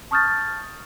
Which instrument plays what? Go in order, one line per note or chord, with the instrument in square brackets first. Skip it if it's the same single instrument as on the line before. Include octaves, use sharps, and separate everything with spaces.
[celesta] A5 C#6 D#6 F6 G6 A6